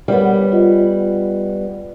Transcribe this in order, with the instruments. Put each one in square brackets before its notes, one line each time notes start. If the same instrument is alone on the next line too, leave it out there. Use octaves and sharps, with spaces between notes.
[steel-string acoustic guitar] G3 B3 [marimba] A#4 C#5
[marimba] F4 D#5